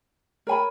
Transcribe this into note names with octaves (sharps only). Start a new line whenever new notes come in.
A#4 C#5 G#5 B5